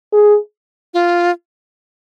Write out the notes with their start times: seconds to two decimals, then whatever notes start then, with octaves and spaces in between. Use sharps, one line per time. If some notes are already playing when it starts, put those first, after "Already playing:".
0.13 G#4
0.94 F4